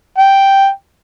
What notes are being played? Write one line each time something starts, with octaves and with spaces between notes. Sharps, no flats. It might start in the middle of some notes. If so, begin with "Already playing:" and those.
G5